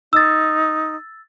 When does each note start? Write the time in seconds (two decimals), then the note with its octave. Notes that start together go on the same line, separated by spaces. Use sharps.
0.13 D#4 E6 A6